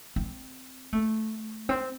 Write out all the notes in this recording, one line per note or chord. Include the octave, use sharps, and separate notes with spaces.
C4
A3
C4